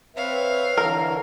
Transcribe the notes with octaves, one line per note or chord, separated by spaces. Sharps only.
C4 B4 C#5 E5 F5
D3 E3 A#4